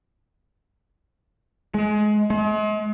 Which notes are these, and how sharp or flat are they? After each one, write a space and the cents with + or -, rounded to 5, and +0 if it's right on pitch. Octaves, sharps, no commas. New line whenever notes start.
G#3 +25
G#3 +40